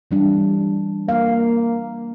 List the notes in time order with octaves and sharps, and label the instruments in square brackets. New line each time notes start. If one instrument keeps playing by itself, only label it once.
[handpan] E3 G3 D4
[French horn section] A#3 [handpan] F5